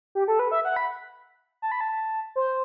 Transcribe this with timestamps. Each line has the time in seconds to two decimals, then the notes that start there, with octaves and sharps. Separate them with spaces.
0.15 G4
0.28 A4
0.39 B4
0.51 E5
0.65 F#5
0.76 B5
1.62 A5
1.72 B5
1.81 A5
2.36 C5